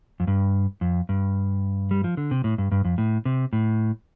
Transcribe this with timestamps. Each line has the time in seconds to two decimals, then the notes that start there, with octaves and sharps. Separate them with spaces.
0.20 F2
0.27 G2
0.81 F2
1.09 G2
1.91 G3
2.04 F3
2.17 D3
2.31 C3
2.44 A2
2.58 G2
2.71 G2
2.85 F2
2.98 A2
3.25 C3
3.53 A2